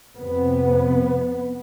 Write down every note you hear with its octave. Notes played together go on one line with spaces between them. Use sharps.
F2 C3 B3